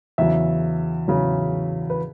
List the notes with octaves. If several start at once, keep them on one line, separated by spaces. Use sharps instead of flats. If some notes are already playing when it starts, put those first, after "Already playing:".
E2 C#3 F#3 E5
E2 C#3 F#3
B4